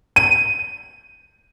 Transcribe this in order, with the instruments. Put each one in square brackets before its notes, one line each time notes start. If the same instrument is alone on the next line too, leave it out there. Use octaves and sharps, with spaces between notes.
[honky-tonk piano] D#7